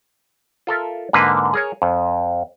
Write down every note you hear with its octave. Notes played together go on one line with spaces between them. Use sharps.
F4 A4 A#4 E5
G#2 D3 A#3 B4
G#4 A#4 C#5
F2